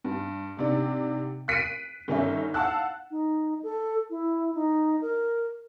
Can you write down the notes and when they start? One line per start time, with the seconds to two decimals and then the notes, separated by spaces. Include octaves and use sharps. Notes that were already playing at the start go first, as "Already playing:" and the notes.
0.04 G2
0.57 G#2 C3 D4
1.48 F#6 B6 C7 D7 D#7
2.08 G1 D#3 C#4 D#4 E5
2.54 F5 F#5 A5 E6 F#6
3.11 D#4
3.63 A4
4.10 E4
4.55 D#4
5.02 A#4